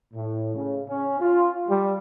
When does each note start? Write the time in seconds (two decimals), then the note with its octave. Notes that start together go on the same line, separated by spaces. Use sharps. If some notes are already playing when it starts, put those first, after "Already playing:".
0.14 A2
0.55 C#3
0.88 C#4
1.20 F4
1.67 G3